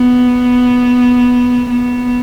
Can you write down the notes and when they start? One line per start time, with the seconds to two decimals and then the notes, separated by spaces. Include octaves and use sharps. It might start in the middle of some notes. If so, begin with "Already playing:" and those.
Already playing: B3
1.70 B3